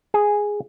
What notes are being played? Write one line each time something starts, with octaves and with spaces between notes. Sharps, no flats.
G#4